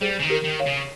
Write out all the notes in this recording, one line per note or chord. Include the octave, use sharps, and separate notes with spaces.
G3 G#4 C5
C#3
D#3
G4 A#4
D#3
C#5 F5
C#3